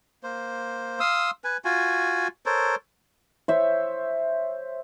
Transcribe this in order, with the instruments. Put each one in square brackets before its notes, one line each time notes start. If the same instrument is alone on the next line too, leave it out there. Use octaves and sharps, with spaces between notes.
[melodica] A#3 C5
F5 C6 D#6 E6
B4 G#5
F4 F#4 G#5
A4 A#4 C5 C#5
[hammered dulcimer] C5 C#5 E5